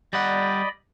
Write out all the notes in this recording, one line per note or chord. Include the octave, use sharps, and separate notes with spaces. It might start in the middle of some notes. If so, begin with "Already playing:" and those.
G3 D5 D#5 F#5 B5